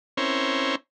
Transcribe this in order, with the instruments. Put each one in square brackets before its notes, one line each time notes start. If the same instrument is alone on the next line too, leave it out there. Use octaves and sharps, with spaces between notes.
[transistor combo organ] C4 C#4 E4 A#4 C5 C#5